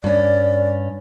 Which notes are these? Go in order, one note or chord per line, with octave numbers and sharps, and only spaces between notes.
G2 C#4 D5